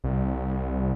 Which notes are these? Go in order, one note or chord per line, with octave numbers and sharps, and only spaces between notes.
C2